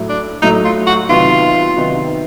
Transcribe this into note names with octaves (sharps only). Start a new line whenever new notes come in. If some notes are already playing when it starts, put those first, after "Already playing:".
Already playing: A2 F#3 A3
D4
A2 F#3 A3 D#4
F4
F#4
C3 D#3 F#3 B3 D#4 F4
C3 D#3 F#3 B3 D#4